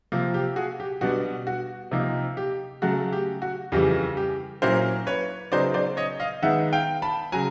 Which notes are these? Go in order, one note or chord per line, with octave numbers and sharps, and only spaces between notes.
C3 F3 A#3
G4
F#4 G#4
G4
B2 G3 B3 D4 F#4
F#4
C3 F3 A#3 D#4
G4
C#3 F#3 A3 F#4
G4
F#4
F2 C#3 E3 G3 G4
G4
A#2 F#3 A#3 C#4 E4 A#4 C5
B4 C#5
C#3 F#3 B3 D#4 C5 D5
C5 D5
C#5 D#5
D#5 F5
D#3 G#3 B3 D#4 E5 F#5
F5 G5
A5 B5
C#3 F#3 G#5 A#5